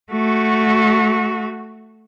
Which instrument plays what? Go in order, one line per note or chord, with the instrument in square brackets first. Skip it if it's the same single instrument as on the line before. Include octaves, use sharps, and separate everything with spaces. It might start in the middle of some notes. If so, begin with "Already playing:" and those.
[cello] A3 F#4